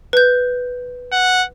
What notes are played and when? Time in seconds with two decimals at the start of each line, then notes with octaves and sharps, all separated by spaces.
0.13 B4 G6
1.12 F#5